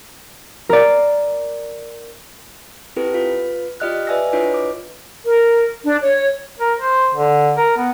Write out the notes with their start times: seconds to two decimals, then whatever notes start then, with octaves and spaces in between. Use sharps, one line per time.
0.69 A#4 D5
2.96 C4 E4 G4 A4 B4
3.14 F4 B4
3.80 F4 G4 D5 D#5 F6 F#6
4.07 B4 D5 E5 G#5 E6 A#6
4.33 D4 E4 F4 B4 C#5 D#5
4.54 D6
5.25 A#4
5.84 D4
6.02 C#5
6.59 A#4
6.79 C5
7.15 D3
7.57 A#4
7.77 B3